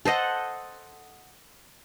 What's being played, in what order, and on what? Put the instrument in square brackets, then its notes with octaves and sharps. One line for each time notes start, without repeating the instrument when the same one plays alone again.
[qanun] A4 C5 D#5 F#5